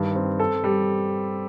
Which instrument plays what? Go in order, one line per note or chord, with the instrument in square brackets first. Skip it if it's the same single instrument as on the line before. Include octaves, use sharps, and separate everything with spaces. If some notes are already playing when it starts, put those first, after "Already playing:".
Already playing: [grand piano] G2 D#3
C4
A4
G3